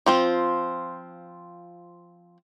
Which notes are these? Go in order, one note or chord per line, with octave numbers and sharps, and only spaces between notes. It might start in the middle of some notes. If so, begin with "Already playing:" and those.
F3 C4 F4